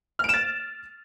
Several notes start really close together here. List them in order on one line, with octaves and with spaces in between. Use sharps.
F6 D7 E7 A6